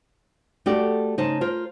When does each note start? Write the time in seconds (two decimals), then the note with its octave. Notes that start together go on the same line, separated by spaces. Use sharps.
0.66 A3 F#4 G4 A4 D5
1.18 C#3 D#4 C5 A5
1.41 F4 A#4 C5